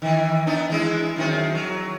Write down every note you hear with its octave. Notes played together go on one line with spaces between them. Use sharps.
D#3 E3
B3 D4 D#4
E3 G#3 E4
F#2 D#3 C4
F#3